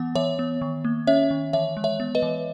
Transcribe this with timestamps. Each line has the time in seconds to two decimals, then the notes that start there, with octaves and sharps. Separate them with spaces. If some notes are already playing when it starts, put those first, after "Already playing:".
Already playing: E3 B3 F#5
0.15 E3 C#5 E5
0.39 B3
0.62 D#3
0.84 A#3
1.07 C#4 C#5 E5
1.31 D#3
1.53 E3 C#5 E5
1.77 G#3
1.84 C#5 E5
2.00 B3
2.15 B4 D#5
2.22 E3